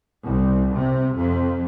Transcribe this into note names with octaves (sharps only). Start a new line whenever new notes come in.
C2
C3
F2